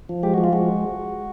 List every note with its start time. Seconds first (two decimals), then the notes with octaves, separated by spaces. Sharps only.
0.09 F3
0.23 G#3 G4
0.34 F3 F#4
0.44 F4
0.53 G#3 F#4